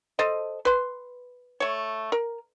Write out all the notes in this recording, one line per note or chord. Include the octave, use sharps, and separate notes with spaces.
A4 C5 D#5
B4 C6
A3 C#5
A#4